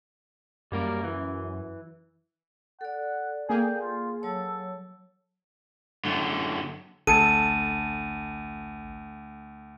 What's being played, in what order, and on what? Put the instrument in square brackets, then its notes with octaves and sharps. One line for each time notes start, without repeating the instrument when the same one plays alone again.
[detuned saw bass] F#2 [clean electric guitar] G3 A#3 A#4
[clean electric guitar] E3
[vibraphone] A4 D5 [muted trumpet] F#5
[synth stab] A#3 G#4 [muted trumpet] G5
[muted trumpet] F4
[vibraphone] F#3 C#5 [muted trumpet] A4
[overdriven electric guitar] F#2 D3
[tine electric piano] A1 [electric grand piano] D2 A5 C#7 [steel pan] A4 [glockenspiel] D#7